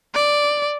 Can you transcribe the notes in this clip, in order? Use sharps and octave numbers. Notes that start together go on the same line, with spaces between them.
D5